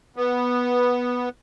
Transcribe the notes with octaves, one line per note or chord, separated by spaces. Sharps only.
B3